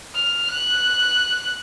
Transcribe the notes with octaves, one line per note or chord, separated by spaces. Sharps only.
F6
F#6